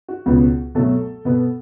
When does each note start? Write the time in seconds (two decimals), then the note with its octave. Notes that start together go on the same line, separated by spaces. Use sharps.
0.08 F#4
0.26 C#2 B2 B3
0.75 B2 F#3 A3 A4
1.25 B2 B3